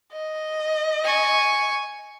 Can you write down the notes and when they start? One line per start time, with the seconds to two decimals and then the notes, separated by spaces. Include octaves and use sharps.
0.12 D#5
1.04 G#5 C#6